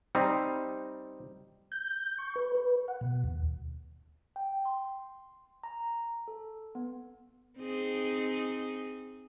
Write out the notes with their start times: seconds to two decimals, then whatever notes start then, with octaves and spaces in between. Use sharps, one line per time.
0.15 G3 C4 D#4
1.72 G6
2.18 C#6
2.36 B4
2.55 B4
2.88 F#5
3.01 B2
3.24 D#2
4.36 G5
4.65 C6
5.63 A#5
6.28 A4
6.75 B3
7.58 C4 D#4 G#4